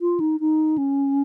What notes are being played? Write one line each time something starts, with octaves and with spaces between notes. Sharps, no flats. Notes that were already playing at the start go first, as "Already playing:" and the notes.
F4
D#4
D#4
C#4